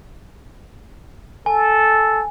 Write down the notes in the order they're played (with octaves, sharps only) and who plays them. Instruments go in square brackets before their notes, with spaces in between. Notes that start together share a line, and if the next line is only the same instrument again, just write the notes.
[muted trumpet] A4 [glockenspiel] G#5